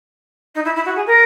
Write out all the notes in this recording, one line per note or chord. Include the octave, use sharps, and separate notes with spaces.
D#4
E4
E4
F#4
G#4
A#4